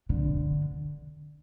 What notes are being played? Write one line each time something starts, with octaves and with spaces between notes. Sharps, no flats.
D3